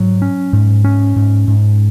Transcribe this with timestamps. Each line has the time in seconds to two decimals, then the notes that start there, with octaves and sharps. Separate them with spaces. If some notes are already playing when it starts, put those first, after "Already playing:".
Already playing: G#2 F#3
0.22 C#4
0.53 G#2
0.85 C#4
1.16 G#2
1.48 G#2